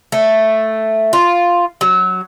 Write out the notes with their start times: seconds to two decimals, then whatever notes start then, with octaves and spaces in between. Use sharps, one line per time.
0.12 A3
1.13 F4
1.81 F#3